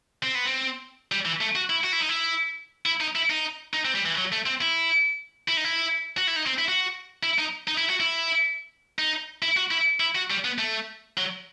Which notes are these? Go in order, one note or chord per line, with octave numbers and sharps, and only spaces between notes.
C4
B3
C4
G3
E3
A3
F#4
E4
F#4
E4
D#4
E4
E4
D#4
E4
D#4
D#4
C4
G3
E3
F#3
A3
C4
E4
E4
D#4
E4
F#4
E4
D#4
C4
E4
F#4
E4
D#4
D#4
E4
F#4
E4
D#4
E4
F#4
E4
E4
F#4
G3
B3
A3
F#3